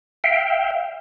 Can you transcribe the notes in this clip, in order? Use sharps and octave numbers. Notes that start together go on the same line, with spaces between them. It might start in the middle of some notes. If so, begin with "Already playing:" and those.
E5 F5 G5